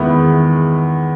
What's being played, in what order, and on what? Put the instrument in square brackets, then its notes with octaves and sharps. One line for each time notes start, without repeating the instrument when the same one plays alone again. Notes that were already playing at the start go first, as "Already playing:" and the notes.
Already playing: [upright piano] E2 D#3 G#3 B3 E4 B5